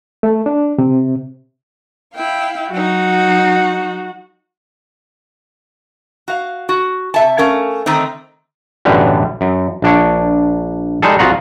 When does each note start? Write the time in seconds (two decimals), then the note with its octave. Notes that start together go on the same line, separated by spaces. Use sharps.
0.23 A3
0.46 D4
0.78 C3
2.14 E4 F5 G5
2.71 F#3 D#4 F#4
6.28 F#4 F5
6.69 F#4
7.14 C3 E5 A5
7.38 A3 C#4 A#4 F5
7.86 D3 D#3 A3 C4 D#4
8.85 B1 F#2 A2 D3 E3 G3
9.41 F#2
9.82 A#1 D4 C#5
11.02 G3 G#3 D#4 G#4 A4
11.19 C2 F4 F#4 G#4 F#5 A#5